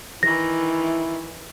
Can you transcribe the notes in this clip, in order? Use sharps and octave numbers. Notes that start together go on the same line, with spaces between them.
D#3 E3 E4 A#6